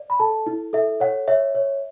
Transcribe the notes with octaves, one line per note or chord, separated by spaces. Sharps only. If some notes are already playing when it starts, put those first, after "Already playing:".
Already playing: D5
B5
A4 A5
E4
A4 E5
C#5 F#5
C#5 E5
C#5